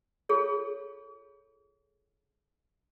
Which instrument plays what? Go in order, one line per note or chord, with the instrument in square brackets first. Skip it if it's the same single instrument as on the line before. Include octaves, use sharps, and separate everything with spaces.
[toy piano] F4 G#4 A4 C#5